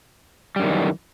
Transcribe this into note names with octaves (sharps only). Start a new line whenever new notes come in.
F#2 D#3 E3 G3